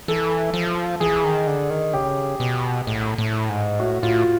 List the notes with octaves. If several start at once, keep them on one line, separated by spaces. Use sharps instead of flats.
E3 A4
F3
E3 G#4
D#3
D3
D#3
C#3 G4
B2
A2
A2
G#2
A2 F#4
A2 F4